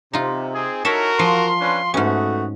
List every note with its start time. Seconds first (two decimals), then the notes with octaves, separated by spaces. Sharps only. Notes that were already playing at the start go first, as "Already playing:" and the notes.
0.13 C3 D#4 F4
0.54 C4 G#4
0.85 D#4 E4 F#4 A4 A#4 C#5 E5
1.19 F3 F4 C6
1.60 C#4 D4 B4
1.94 G#2 A3 B3 C#4 F#4